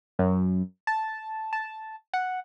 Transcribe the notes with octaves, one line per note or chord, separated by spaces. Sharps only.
F#2
A5
A5
F#5